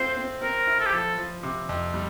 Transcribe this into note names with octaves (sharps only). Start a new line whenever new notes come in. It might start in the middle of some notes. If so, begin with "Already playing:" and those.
Already playing: A3 C4 F4 C5
C4
C4 A#4
E4
A4
G4
F3 A4
F3
C3
F2
G3